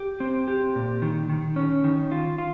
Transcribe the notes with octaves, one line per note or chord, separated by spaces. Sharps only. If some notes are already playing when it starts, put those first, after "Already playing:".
Already playing: G4
C4
G4
A#2
D#3
D#3
C#4
D#3
F4
F4